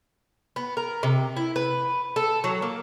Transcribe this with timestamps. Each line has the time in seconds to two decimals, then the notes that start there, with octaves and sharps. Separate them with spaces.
0.56 B3
0.77 A#4
1.03 C3
1.37 E4
1.56 B4
2.16 A4
2.44 F#3
2.62 A#3